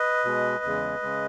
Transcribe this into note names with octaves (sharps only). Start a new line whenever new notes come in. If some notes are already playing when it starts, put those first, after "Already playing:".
Already playing: B4 D#5
B2 G#3
E2 C#3 G#3
C#3 G#3